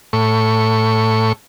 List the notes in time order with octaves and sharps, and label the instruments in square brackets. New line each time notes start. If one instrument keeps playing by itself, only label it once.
[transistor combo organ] A2 C#6